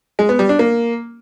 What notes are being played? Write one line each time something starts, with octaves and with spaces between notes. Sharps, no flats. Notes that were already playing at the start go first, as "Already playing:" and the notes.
G#3
B3
G3
D4
A#3